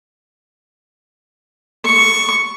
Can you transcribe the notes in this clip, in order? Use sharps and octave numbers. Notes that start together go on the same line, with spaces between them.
C#6